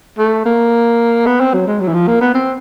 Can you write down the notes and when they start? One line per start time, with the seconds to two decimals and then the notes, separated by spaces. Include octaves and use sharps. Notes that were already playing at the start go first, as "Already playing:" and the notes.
0.19 A3
0.46 A#3
1.26 B3
1.40 C4
1.54 F#3
1.67 G#3
1.81 F#3
1.88 E3
1.94 F3
2.08 A#3
2.21 B3
2.35 C4